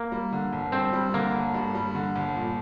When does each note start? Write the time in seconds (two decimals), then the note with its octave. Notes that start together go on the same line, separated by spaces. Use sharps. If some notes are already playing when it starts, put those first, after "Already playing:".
Already playing: A#3
0.12 G3
0.33 D3
0.53 G1
0.72 G2 C4
0.93 G3
1.14 D3 A#3
1.34 G1
1.54 G2
1.75 G3
1.95 D3
2.16 G1
2.35 A#2